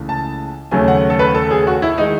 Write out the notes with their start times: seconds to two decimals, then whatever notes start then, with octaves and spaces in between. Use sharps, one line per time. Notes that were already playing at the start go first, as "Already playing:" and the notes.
Already playing: C#2 C#3 E3 A3
0.09 A5
0.71 D#2 C#3 F#3 A3 G#5
0.88 F#5
1.10 A4
1.19 B4
1.35 A4
1.51 G#4
1.67 F#4
1.82 E4
1.98 D#3 G#3 D#4